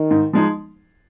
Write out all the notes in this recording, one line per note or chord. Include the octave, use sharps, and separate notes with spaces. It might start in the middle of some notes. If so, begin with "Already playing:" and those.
Already playing: D#3
G#2
F3 G#3 D#4